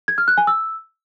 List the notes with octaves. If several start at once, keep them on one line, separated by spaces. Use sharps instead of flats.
G#6
F6
F#6
G#5
E6